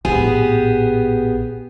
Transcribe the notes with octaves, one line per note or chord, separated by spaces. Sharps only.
A#1 A2 B3 G4 G#4